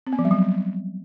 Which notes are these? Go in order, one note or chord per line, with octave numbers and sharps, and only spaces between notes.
C4
B3
F3
G3
F#3